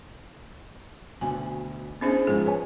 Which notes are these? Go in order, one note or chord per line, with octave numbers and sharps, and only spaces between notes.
D2 B2 G#5
B3 C#4 D4 E4 G#4 C5
G#2 F3 G#3 G#4
B4 C#5 G#5